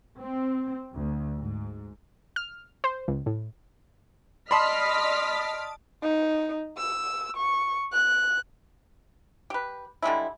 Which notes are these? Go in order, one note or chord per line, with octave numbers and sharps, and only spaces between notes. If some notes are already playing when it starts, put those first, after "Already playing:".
C4
D2
G#2
F6
C5
C#2
A2
D5 D#5 A5 B5 C6 D#6 F6 B6
D#4
E6
C#6
F#6
G4 B4
D3 G3 G#3 E4